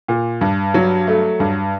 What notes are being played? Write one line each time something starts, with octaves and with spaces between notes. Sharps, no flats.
A#2
G2
F#3
A3
G2